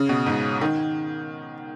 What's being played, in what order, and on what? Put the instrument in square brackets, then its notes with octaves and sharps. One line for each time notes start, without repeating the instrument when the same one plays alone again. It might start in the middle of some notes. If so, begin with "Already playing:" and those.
Already playing: [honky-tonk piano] C#3
B2
G#2
D#3